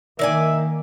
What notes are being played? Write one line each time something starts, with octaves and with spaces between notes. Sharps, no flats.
D#3 A#3 D5 E5 G#5